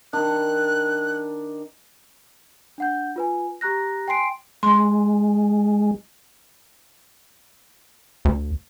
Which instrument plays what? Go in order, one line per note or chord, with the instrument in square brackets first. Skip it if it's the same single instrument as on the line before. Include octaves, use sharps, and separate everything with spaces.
[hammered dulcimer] D#3 D4 [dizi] F#6
[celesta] D4 F#5 G6
F4 B4 G#5
G4 A#5 F#6 A#6
G5 G#5 C6 C7 D7
[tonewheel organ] G#3 [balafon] C6
[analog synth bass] D2